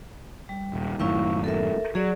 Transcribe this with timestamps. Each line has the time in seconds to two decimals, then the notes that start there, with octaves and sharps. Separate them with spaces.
0.49 G3
0.73 D#1
1.00 F#2 A2 D#3 E4 F5 C#6
1.44 A4 A#4 E5
1.95 F#3 G#4 D5